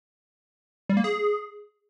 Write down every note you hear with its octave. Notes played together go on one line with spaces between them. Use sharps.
G3
A#3
G#4